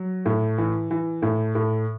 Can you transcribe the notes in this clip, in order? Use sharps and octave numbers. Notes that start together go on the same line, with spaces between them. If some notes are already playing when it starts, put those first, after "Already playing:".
Already playing: F#3
A2
E3
E3
A2
A2